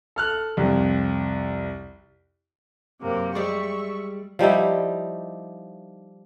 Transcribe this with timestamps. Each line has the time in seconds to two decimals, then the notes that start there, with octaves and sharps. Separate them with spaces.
0.16 A4 F6 F#6
0.57 C2 F2
3.01 F#2 C3 A#3
3.35 G3 G#3 E5 C#6
4.39 F3 G3 D#4 E4